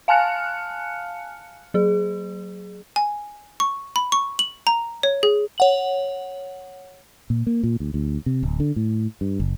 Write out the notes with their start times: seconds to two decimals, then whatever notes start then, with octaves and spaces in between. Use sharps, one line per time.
0.08 F5 G#5 A5 F6 F#6 C#7
1.74 F#3 G#4
2.96 G#5
3.60 C#6
3.96 B5
4.12 C#6
4.39 F#7
4.67 A#5
5.03 C#5
5.23 G#4
5.58 C#5 F#5 F#7
7.30 A#2
7.47 A#3
7.63 A#2
7.80 D2
7.94 D2
8.26 C3
8.43 D1
8.60 D3
8.76 A2
9.21 G2
9.40 F#1